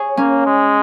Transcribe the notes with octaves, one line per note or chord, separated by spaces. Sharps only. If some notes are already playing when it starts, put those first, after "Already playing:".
Already playing: G#4 C#5 F5
A#3 C#4
G#3